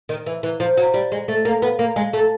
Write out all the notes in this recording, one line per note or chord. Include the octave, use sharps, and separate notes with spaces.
D#3
E3
E3
F3
F#3
G3
G#3
A3
A#3
B3
A#3
G#3
A3